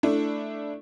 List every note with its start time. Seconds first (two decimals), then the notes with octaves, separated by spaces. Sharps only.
0.03 A3 D4 E4